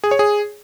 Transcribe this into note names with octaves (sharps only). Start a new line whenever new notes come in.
G#4
C#5
G#4